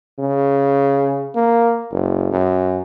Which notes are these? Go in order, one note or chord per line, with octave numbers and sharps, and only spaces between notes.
C#3
A#3
F#1
F#2